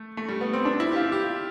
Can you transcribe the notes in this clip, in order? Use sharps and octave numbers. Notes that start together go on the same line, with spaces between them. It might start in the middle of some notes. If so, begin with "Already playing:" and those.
Already playing: A3
A3
G3
B3
C4
D4
E4
G4
F4
G4